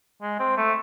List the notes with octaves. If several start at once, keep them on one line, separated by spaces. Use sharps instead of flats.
G#3
C4
A3